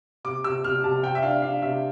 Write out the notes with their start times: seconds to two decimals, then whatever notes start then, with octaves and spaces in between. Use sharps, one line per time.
0.24 C3 D6
0.44 C3 E6
0.64 C3 F6
0.84 C3 A5
1.03 C3 G5
1.15 E5
1.23 D4 F5
1.42 D4 F5
1.62 C3 E5